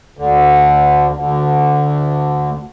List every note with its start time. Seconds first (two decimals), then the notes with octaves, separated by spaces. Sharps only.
0.17 D2 D3
1.16 D2 D3